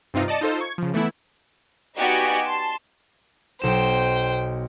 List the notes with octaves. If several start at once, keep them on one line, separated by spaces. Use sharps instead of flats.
G2 C3 C4 D#4 F4
D5 D#5 A5 C#7
D#4 F4 A4 C5
C#6 G#6
C#3 F3
E3 A3 B3 E4
B3 D#4 F#4 G4 D5 G#5
A5 C6
B1 C5 G5 E7